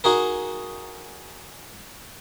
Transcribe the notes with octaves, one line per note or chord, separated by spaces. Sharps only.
D#4 F#4 G#4 A#4